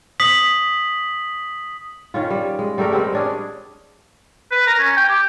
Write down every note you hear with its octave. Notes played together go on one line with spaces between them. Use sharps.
D#6 B6 F#7
D#3 C#4 F4
G3
G#3
G3 A3 G4 A#4
G3 G#3 C4
C#4 D4 G#4
B4
A#4
C#4
G5
G4